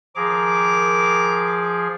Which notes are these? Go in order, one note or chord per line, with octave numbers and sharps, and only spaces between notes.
D#3 F3 G#4 A#5 D6